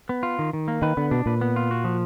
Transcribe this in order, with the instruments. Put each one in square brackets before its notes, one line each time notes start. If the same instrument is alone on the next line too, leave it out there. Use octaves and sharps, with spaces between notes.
[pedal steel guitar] B3
F4
D#3
D#3
A#3
[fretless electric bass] D#3 [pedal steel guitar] B4
[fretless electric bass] D3 [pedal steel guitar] B3
[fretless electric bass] B2 [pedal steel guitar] D4
[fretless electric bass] A#2 [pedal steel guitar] B4
[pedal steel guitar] B3
F4
F#4
F3